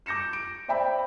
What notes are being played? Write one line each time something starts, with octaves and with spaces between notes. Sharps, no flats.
D6 G6 A#6 C#7 E7
D7
C5 D5 E5 G5 B5